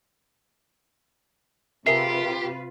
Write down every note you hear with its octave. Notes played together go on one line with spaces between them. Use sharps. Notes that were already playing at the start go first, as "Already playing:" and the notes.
C3 F4 G4 G#4 A#4 B4 E5 C7